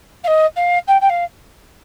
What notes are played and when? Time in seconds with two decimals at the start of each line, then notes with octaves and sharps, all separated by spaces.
0.23 F5
0.27 D#5
0.56 F5
0.87 G5
1.01 G5
1.09 F5